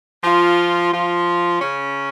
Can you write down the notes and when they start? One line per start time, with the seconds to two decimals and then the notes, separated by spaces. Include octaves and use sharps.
0.24 F3 F4
0.93 F3 F4
1.61 C#3 C#4